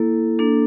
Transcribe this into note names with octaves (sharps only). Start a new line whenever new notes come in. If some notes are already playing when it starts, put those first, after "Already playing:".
Already playing: A#3 E4 A4
A#3 D4 A4